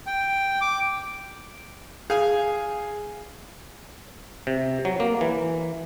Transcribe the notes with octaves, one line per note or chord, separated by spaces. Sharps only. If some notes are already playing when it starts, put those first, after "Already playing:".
G5
D6
G#4 F5 G#5
C3
F#3
A#3
E3